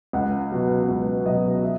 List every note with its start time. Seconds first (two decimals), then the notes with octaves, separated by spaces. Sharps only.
0.13 C#2 F#5
0.52 B2 F#3
0.89 C#2
1.25 B2 F#3 D#5
1.63 E5